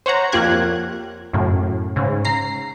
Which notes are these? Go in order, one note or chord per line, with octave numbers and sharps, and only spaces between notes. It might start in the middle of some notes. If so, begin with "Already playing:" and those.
C5 C#5 F#5 A#5
F2 A#3 F4 G4 F#6 G#6
F#2 A2 C#3
G#2 C#3
A#5 C7